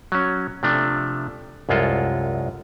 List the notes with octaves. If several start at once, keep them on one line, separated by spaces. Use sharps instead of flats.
F#3 C#4
C3 F3 A3 D4
C2 F#2 G#3 F4 A4